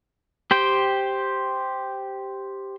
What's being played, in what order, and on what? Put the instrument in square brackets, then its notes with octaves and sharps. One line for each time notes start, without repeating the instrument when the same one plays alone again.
[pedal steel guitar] G4 C5 G5